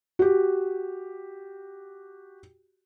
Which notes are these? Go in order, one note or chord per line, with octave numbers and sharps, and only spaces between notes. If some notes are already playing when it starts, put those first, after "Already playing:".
F#4 G4